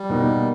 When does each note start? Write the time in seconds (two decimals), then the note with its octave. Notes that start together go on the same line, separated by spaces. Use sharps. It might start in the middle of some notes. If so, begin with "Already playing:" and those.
Already playing: G3
0.10 B2 A#3 D#4